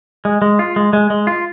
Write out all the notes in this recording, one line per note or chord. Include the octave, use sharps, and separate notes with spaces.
G#3
G#3
F4
G#3
G#3
G#3
F4